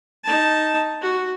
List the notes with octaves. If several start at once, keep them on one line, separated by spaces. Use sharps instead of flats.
D#4 A5
F#4